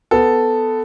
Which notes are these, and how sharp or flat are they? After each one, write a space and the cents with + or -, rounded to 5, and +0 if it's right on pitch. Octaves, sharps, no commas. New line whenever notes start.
B3 +15 A4 +0